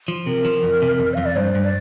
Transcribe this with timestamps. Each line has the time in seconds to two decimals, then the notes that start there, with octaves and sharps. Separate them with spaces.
0.08 F3
0.26 C3 A#4
0.45 F3
0.63 F2
0.82 C3
1.00 F2
1.14 F2 F5
1.26 D5
1.36 G2 C5
1.55 G2
1.64 D5